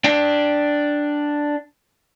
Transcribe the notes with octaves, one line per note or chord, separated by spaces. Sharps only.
D4 G5